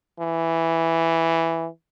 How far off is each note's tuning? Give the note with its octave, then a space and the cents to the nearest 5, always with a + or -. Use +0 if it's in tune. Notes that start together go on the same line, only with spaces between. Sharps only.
E3 +0